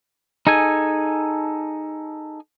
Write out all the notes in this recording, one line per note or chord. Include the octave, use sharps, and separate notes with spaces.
D#4 G#4 A4 G#5